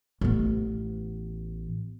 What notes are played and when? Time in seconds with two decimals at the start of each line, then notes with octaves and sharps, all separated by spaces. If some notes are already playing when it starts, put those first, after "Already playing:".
0.21 A1 B3